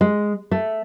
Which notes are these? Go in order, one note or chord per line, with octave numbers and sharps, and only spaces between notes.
G#3
A3